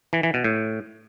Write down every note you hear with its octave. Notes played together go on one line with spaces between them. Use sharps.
E3
E3
B2
A2